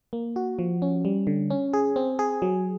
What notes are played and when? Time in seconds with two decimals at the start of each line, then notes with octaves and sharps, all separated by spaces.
0.13 A#3
0.36 F#4
0.59 F3
0.82 C#4
1.05 G3
1.27 D3
1.50 C#4
1.73 G#4
1.96 C4
2.19 G#4
2.42 F#3